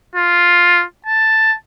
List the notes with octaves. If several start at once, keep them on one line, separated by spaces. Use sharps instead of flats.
F4
A5